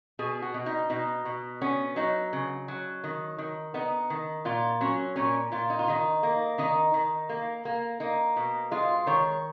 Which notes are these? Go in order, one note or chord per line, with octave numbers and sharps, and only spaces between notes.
B2 G#4
F#4
B2
D#4
B2 D#4
B2
B3 C#4
F#3 D#4
C#3
F#3
D#3
D#3
B3 D#4
D#3
A#2 F4
F#3 C#4
A#2 C#4
A#2 F4
D#4
F4
D#3 D#4
A#3
D#3 D#4
D#3
A#3
A#3
A#3 D#4
B2
G#3 F4
D#3 C#5